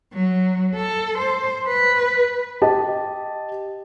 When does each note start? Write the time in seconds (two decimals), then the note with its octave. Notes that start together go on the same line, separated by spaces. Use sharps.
0.13 F#3
0.75 A4
1.18 C5
1.68 B4
2.62 G4 D#5 A5